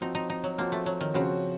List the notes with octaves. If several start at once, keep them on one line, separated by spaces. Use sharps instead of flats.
F3 C4 D#4 F#4
D#4
D#4
F#3
F3 A#3 C4 F#4
A3
F#3
D#3
C#3 F3 C4 F#4